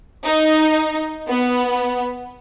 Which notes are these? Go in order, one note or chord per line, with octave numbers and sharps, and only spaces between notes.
D#4
B3